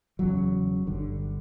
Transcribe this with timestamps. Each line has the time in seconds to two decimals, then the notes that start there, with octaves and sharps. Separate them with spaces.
0.19 E1 E2 C#3 F#3
0.87 G1 G2 D3